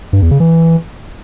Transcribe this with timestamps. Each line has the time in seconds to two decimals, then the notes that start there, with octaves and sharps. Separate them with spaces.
0.13 G2
0.22 E2
0.31 C#3
0.40 E3